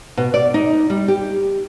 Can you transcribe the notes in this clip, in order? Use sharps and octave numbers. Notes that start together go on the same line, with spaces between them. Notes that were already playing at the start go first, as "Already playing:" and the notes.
B2
D5
D#4
G3
G4